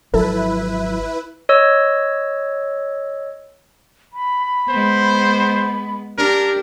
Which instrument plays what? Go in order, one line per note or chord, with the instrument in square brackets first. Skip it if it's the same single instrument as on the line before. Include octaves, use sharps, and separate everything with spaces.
[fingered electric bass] G#1 F3 F#3 [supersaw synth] E4 B4 [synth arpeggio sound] A4
[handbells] C#5 D#5 E6
[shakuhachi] B5
[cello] G#3 B3 [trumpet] C5
[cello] D4 [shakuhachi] G4 [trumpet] A#4